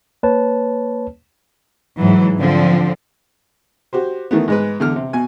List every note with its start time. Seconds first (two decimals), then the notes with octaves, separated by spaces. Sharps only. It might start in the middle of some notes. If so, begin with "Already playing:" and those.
0.23 A#3 B4 C#5 A5
1.99 G#2 E3 F#3
2.38 D3 F3 C4
3.93 F#4 G4 C5
4.31 D#3 E3 A3 B3
4.48 G#2 G#3 B4
4.80 E2 D3 F6
4.96 C3
5.13 B2 G#5